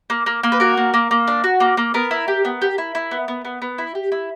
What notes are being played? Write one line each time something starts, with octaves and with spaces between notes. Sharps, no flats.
A#3
A#3
A#3
B4
F#4 A#4
A#3
A#3
A#3
D4
F#4
A#3
A#3
B3 A#4
E4
G4
B3
G4
E4
E4
B3
B3
B3
B3
E4
G4
E4